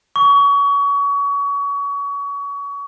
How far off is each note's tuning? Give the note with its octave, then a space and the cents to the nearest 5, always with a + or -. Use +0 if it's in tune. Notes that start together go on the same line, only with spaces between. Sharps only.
C#6 +30